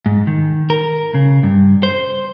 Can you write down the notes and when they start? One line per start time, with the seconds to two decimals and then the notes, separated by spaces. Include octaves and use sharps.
0.06 G#2
0.27 D#3
0.70 A#4
1.15 C#3
1.43 G2
1.83 C5